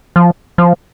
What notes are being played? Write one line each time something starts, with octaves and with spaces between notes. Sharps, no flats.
F3
F3